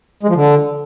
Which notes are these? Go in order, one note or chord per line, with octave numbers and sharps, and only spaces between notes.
G#3
F3
D3